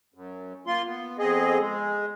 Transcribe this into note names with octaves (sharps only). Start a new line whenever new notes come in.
F#2
A#3 F4 C6
B3
F2 B3 C4 G#4 D#5
G#3